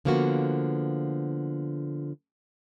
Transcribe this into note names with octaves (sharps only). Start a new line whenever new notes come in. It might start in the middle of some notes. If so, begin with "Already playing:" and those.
D3 F3 A#3 B3 F#4